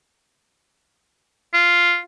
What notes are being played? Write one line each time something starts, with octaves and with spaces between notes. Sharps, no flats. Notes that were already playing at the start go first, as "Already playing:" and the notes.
F4